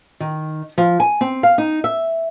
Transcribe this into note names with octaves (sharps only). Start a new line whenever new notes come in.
D#3
F3
G#5
C4
F5
D#4
E5